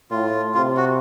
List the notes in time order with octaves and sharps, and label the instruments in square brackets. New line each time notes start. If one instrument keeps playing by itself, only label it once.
[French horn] A2 [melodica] F4
[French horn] C3 [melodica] F4
[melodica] F#4